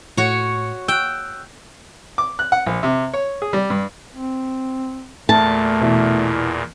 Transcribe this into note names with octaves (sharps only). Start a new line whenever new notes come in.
A2 F#4 C#5
G5 E6 F#6
D6
F#6
F#5
A#1
C3
C#5
G#4
G3
G2
C4
E2 A#2 A3 A5
B2 E3